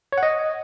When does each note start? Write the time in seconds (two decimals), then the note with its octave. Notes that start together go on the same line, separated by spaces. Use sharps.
0.12 C#5
0.18 F#5
0.23 D#5